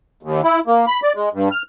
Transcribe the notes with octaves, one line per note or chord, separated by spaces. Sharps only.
D#2
E4
A#3
B5
D5
G#3
G2
F6